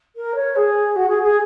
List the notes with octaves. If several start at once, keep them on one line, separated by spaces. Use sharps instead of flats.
A#4
C#5
G#4
F#4
G#4
G#4